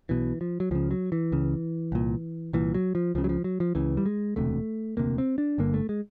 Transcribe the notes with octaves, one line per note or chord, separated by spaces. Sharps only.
B1 B2 E3
F3
F#3
C#2 C#3 F3
F#3
E3
C#2 C#3
C2 A#2
C2 A#2 E3
F#3
F3
C#2 C#3 F3
F#3
F3
F#3
F3
C#2 C#3 E3
G3
G#3
E1 D2 C3 A3
E1 D2 C3 A#3
C4
D4
G1 G2 D3 A#3
A3
G#3